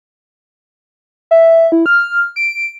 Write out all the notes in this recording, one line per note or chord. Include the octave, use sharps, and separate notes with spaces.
E5
E4
F6
D7